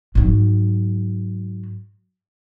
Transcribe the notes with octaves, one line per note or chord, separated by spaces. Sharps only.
G#2 F#3